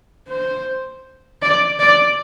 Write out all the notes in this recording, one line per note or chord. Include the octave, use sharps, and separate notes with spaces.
C5
D5
D5